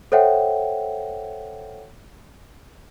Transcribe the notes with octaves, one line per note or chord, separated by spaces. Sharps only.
A4 C5 C#5 E5 F#5 G5